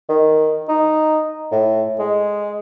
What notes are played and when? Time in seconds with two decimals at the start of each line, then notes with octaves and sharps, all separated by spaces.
0.09 D#3
0.69 D#4
1.52 A2
1.99 G#3